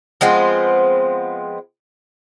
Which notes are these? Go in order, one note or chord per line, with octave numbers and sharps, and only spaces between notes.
F3 G#3 B3 C4